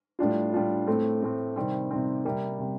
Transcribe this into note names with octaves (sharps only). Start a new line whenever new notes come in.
A2 G3 D4 F4
A2 G3 D4 F4
A2 A3 C4
A2 A3 C4
C3 D#3 G3 C4
C3 D#3 G3 C4
C3 G3 A#3
C3 G3